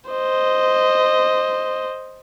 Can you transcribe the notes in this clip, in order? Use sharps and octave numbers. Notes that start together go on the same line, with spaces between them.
C5 D#5